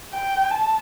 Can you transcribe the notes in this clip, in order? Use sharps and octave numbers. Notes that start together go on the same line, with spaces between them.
G5
A5